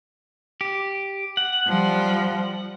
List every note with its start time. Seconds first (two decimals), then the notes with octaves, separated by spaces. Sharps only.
0.61 G4
1.37 F#5
1.68 F3 G3